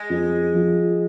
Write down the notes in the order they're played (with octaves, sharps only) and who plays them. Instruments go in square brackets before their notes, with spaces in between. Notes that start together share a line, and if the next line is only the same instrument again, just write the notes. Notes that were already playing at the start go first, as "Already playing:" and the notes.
Already playing: [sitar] G#3
[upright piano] F2
F3